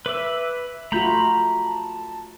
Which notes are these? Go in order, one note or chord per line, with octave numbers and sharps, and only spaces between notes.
B4 E5 D6 E6
A3 F4 F#4 A#5 B5 G6
A5